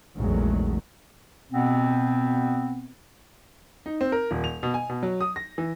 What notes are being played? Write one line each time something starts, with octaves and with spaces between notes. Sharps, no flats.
A#1 E2 D#3 F#3 G#3 A3
B2 B3 C4
D#4
C4
A#4
D#1
F7
B2
G#5
B2
F#3
D#6
A#6
E3